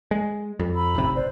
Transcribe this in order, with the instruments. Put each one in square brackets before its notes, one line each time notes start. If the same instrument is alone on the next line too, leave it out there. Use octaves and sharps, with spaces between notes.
[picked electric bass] G#3
F2
[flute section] A#5 B5 E6
[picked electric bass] D1 G#1 C3
[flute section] B4 C5 D5